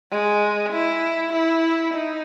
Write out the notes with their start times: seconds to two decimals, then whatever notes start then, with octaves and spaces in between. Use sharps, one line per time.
0.11 G#3
0.72 E4
1.33 E4
1.94 D#4